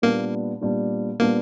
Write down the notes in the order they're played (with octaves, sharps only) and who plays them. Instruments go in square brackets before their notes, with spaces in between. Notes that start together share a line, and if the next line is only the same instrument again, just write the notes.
[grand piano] A#2 G3 B3 D4 [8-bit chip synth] A#3
[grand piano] A#2 G3 B3 D4
[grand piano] A#2 G3 B3 D4 [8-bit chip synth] A#3